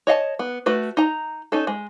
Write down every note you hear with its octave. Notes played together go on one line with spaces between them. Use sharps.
C#5 D#5 F5 A5
B3
A3 F#4 B4
D#4 A#5
C#4 D#4 A4
G#3